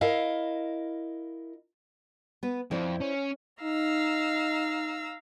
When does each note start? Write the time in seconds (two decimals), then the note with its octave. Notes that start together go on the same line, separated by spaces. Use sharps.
0.01 E4 A#4 D#5 F5
2.43 B3 B4
2.71 F2 E4 C5 D5
3.00 C#4
3.63 D#4 F5 A#5 E6